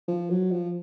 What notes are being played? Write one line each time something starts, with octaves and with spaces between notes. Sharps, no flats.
F3
F#3
F3